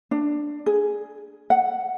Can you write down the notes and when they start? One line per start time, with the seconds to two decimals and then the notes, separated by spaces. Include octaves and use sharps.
0.11 D4
0.66 G#4
1.50 F#5